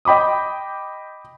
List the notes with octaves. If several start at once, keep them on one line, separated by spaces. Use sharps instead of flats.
D#5 G5 B5 D6 D#6